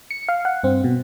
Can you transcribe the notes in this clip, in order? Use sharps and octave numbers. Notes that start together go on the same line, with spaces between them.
C#7
F5
F#5
G2 C4
B2